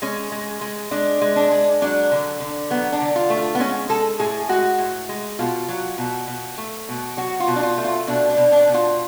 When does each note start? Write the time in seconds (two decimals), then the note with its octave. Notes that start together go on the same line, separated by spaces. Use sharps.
0.02 G#3 C#4
0.32 G#3
0.61 G#3
0.91 G#3 D4
1.21 G#3
1.36 D4
1.51 G#3
1.82 F#3 D4
2.12 D3
2.40 D3
2.70 F#3 B3
2.92 D4
3.01 D3
3.16 F4
3.30 A3
3.37 F4
3.55 B3
3.60 G#3 C#4
3.89 G#3 A4
4.19 A2 G#4
4.49 G#3 F#4
4.79 A2
5.09 G#3
5.39 B2 F4
5.69 F#3
5.98 B2
6.28 B2
6.58 A3
6.89 B2
7.17 F#3 F#4
7.40 F4
7.47 B2
7.56 D4
7.63 F4
7.78 A3
7.85 F4
8.07 B2 D4
8.30 D4
8.37 B2
8.52 D4
8.67 B2
8.74 F4